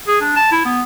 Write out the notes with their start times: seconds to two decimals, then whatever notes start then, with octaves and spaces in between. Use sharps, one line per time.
0.08 G#4
0.21 D4
0.36 A5
0.52 E4
0.65 B3